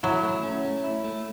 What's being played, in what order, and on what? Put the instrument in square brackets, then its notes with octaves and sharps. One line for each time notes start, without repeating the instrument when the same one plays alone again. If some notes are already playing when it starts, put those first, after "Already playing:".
[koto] F#3 [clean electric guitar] E4
[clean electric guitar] A3
C#4
A3
E4
A3